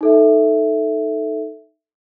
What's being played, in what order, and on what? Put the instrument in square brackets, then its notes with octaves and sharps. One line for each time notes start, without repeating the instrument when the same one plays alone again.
[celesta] D#4 A4 E5